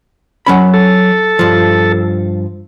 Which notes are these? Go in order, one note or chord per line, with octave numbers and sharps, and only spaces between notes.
F#3 C#4 B5
A4
G2 F3